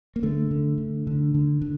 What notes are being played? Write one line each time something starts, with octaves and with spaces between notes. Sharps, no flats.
A#3
D3 A3
D3
D3
D3
D3
D3